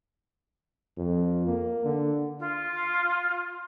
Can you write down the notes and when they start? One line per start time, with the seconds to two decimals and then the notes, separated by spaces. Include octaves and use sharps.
0.97 F2
1.47 A#3
1.85 D3
2.39 F4